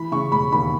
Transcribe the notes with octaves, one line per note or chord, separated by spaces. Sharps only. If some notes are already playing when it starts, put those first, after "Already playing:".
Already playing: E3 B5
C#3 C#6
E1 B5
D#2 B5